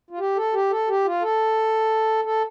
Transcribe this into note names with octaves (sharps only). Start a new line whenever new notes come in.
F4
G4
A4
G4
A4
G4
F4
A4
A4